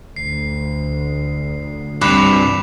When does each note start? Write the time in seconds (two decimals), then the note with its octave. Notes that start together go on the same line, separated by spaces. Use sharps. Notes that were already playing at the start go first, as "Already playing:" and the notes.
0.16 D2 C7
2.01 C2 G2 C3 B4 D6 E7 F7